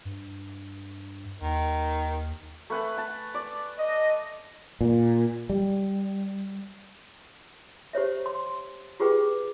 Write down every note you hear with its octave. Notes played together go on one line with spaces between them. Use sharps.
G2
D#2 D#3
A3 B4 G#5
A5
D5
D#5
A#2
G3
G4 C5 C#5 E5
C6
F4 G4 G#4 B4 G5